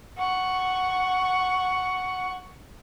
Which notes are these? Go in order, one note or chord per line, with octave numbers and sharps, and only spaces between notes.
F#5 C#6